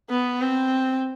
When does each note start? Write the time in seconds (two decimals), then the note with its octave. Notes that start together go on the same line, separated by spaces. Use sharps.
0.10 B3
0.41 C4